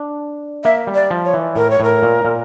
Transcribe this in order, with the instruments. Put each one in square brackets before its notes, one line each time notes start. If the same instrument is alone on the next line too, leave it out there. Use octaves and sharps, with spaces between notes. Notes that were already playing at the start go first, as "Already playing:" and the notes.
Already playing: [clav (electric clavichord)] D4
[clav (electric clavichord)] A#3 [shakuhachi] E5
[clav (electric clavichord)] G3
[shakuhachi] D5
[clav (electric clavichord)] F3
[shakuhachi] C#5
[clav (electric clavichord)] E3
[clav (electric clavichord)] A2 [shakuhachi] A#4
[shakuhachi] C#5
[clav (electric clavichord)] A2 [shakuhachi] A#4
[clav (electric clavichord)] A#2
A#2